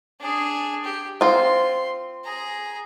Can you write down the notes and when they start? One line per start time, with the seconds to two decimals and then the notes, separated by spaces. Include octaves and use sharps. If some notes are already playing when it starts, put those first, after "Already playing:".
0.20 D4 G#4
0.84 G4
1.21 C4 F4 C6
2.25 G#4 A#5